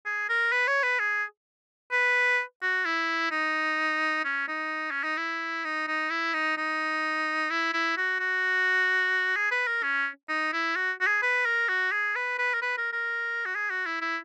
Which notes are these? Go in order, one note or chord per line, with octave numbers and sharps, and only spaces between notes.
G#4
A#4
B4
C#5
B4
G#4
B4
F#4
E4
D#4
C#4
D#4
C#4
D#4
E4
D#4
D#4
E4
D#4
D#4
E4
E4
F#4
F#4
G#4
B4
A#4
C#4
D#4
E4
F#4
F#4
G#4
B4
A#4
F#4
G#4
B4
B4
A#4
B4
A#4
A#4
F#4
G#4
F#4
E4
E4